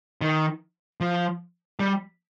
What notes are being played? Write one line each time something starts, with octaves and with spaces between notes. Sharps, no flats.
D#3
F3
G3